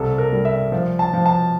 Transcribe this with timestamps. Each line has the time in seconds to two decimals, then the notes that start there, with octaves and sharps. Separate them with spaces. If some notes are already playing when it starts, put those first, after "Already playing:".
Already playing: C2 A4
0.18 A#4
0.32 G3
0.45 E5
0.72 F3
0.99 A5
1.13 F3
1.26 A5